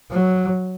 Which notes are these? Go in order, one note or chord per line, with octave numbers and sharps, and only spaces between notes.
F#3